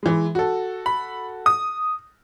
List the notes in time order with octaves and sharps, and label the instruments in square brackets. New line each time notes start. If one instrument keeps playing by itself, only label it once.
[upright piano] E3 G#3
F#4 A4
[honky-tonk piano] B5
D#6